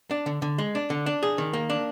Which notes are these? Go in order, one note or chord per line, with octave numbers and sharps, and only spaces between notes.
D4
D3
D3
G#3
D4
D3
D4
G#4
D#3
A#3
D4